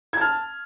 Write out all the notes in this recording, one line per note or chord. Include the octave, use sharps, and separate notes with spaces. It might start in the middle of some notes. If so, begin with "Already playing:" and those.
A5 F6 G#6